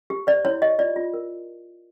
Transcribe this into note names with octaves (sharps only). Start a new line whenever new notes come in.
G4
C5 D5
E4 C#5
G4 D#5
F4 D5
F4
A#4